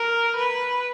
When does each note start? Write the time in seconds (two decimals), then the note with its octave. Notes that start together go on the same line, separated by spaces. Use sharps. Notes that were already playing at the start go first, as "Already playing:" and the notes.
Already playing: A#4
0.36 B4